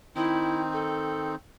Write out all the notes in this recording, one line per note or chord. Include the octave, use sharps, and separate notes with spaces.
D#3 C4 D#4 E4
A4